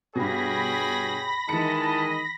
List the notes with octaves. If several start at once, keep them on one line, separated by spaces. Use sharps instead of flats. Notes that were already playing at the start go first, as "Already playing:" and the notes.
G2 B2 G#4 C#5 G5 B5 A#6
D#3 E3 G#3 D#5 A5 C#7